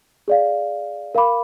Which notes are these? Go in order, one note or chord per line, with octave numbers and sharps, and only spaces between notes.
G#4 D5 F5
A#4 F5 B5 D6